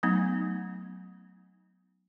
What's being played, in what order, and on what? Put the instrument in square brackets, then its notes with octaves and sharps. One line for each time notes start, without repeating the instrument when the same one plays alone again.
[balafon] F#3 A3 B3 D#4